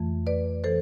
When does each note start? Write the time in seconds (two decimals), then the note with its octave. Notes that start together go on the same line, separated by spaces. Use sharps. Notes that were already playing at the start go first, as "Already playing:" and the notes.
Already playing: F2 E3 A3
0.27 B4 D5
0.64 E3 A4 C5